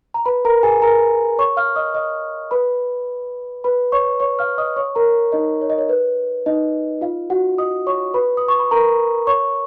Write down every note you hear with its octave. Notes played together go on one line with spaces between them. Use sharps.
A#5
B4 B5
A#4 A#5
G#4 G#5
A#4 A#5
C#5 C#6
F5 F6
D#5 D#6
D#5 D#6
B4 B5
B4 B5
C#5 C#6
C#5 C#6
F5 F6
D#5 D#6
C#5 C#6
A#4 A#5
D#4 D#5
C#5
D#5
C#5
B4
D#4 D#5
F4 F5
F#4 F#5
D#5 D#6
C#5 C#6
B4 B5
D#6
C#6
B5
A#4 A#5
C#5 C#6